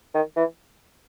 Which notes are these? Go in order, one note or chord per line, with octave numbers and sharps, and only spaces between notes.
D#3
E3